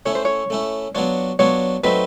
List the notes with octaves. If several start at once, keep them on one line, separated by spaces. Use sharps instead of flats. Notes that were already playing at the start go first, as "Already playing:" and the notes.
A3 C#4 E4 C#5
C5
C#5
A3 C#4 E4
F#3 B3 D4 F4 C#5
F#3 B3 D4 F4 C#5
F#3 A3 C4 D#4 B4